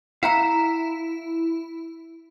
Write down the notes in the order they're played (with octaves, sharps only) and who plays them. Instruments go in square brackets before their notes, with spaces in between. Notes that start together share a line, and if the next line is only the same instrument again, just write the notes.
[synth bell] E4 [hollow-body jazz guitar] F5 F#5 A#5